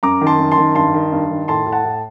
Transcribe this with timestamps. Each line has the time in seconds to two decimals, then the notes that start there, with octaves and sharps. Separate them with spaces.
0.03 F#2 A#5 D6
0.21 D#3
0.27 A5 C6
0.39 F#2
0.51 A5 C6
0.58 D#3
0.75 G2 A5 C6
0.94 D#3
1.12 G2
1.30 D#3
1.48 A2 A5 C6
1.66 A2
1.72 F#5 A5
1.84 A2